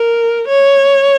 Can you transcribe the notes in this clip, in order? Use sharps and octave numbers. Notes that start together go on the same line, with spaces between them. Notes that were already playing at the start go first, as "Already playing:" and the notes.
Already playing: A#4
C#5